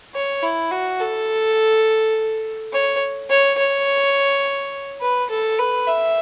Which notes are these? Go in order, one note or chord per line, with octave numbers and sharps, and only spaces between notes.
C#5
E4
F#4
A4
C#5
C#5
C#5
B4
A4
B4
E5